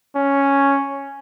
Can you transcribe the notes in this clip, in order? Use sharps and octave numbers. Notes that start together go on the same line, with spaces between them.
C#4